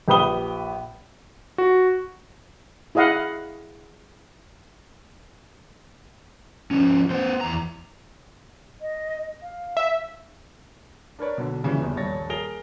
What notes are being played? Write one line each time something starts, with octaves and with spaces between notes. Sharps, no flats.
A#1 G4 B4 B5 D#6 G7
F#4
E4 G#4 D#5 F5 F#5
F3 C#4
B3 C5
E2 A#5
D#5
F5
E5
D4 A#4 B4 C#5 D5
B1 D3
A#2 C#3 E3 G3
D1 G1 E2
D#1 A#1 G2 C#5 A6 A#6
G#4 A#4 A#6 D7 F7 G7